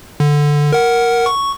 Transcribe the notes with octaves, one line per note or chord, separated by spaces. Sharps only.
D3
A#4 F#5
C#6